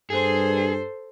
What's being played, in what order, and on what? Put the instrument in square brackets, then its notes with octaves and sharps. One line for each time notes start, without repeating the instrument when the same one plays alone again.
[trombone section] G2 [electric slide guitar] G#4 [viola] A4 C5